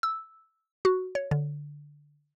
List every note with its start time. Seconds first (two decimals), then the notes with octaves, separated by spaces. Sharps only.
0.03 E6
0.85 F#4
1.15 C#5
1.31 D3